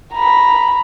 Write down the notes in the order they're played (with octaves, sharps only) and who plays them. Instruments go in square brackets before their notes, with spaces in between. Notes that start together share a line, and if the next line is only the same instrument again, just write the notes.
[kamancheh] A#5 B5